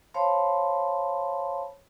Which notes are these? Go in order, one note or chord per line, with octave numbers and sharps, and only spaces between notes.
C5 C#5 F5 A5 B5 C6